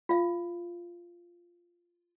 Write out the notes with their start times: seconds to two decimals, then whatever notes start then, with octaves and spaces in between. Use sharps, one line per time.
0.09 F4 F5